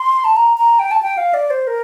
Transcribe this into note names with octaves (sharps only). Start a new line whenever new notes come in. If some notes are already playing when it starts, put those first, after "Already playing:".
Already playing: C6
A5
A#5
A#5
G5
A5
G5
F5
D5
C5
A#4